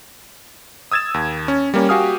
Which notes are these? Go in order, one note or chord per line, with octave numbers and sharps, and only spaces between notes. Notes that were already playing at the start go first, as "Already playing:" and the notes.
D#6 E6 G#6 A6 E7
D#2
C#4
G3 A#3 C#4
F#4 G4 F5 G#5 D#6 F6